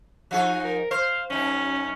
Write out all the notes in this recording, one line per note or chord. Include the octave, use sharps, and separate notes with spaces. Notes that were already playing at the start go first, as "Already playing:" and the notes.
F3 D#4 F#4 G#4
A#4
C5 F5
F#2 C#4 D#4